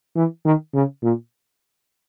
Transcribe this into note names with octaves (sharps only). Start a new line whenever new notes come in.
E3
D#3
C#3
A#2